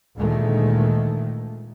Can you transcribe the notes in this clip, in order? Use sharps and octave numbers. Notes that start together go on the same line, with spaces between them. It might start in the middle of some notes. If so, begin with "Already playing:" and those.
D2 A#2 D#3 G#3 A3